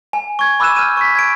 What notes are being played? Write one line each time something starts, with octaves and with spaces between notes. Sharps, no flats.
G#5
C#6 G#6
B5 D6 E6 F#6 D#7 E7
F6 G6 D#7
C#6 B6
G#6 D7